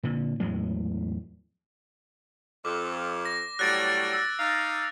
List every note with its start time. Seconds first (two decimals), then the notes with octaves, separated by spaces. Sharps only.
0.03 A#2 D3
0.40 E2 A2 F#3 G#3
2.65 F2 D6
3.25 A#6
3.59 A2 F#3 G3 F#6 A6 D7
4.13 E6
4.39 D#4 F5